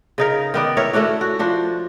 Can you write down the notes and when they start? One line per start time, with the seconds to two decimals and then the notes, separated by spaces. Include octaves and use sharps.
0.18 C#3 D#4 A#4
0.54 D#3 B3 D5
0.77 E4 A#4 C#5
0.93 A3 C#4 D4 F#4
1.21 F#4
1.39 F3 D4 F#4